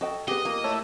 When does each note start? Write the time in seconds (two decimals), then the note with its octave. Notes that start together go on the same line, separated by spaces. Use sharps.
0.01 F#4 A4 D#5 G5
0.28 B3 G4 G#4 D#5
0.45 A#3 F4
0.64 A3 E4 C#5